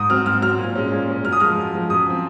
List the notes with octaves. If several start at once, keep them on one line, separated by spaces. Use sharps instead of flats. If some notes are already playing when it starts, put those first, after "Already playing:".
Already playing: G#2 D#6
F#3 C4 F6
G#2 F6
F#3 C4 F6
A#2
G#3 C#4
A#2
G#3 C#4
F#2 F6
D#6
F3 G#3 F6
F#2
F3 G#3
F#2 D#6
F3 C4